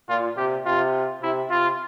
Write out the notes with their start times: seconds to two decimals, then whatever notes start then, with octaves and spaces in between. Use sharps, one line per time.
0.09 A#2 F4
0.37 C3 G4
0.66 C3 F4
1.22 C3 E4
1.50 C3 F4